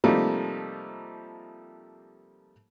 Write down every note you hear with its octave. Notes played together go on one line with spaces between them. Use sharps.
C3 F3 G3 A3 A#3 D#4